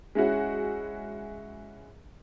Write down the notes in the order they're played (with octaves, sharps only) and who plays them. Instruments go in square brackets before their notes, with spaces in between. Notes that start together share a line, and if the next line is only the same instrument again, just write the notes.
[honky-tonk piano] G#3 C#4 E4 F#4